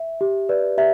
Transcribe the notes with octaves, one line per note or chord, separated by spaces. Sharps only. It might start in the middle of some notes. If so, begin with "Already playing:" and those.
Already playing: E5
G4
B4 D5
G4 E5